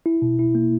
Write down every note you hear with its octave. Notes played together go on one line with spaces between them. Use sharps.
E4
B2
E4
A#3